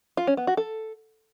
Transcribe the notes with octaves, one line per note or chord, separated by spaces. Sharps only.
F4
C#4
B3
F#4
A4